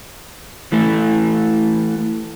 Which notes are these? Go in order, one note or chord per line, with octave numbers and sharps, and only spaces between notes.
E3 A3